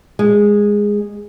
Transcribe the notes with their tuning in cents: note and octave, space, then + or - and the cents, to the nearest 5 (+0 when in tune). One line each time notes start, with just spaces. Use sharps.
G#3 -10